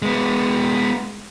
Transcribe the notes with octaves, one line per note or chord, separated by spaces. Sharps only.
G#3 B3